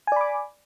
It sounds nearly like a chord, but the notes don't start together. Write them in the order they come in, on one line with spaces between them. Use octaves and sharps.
G#5 D5 B5 D6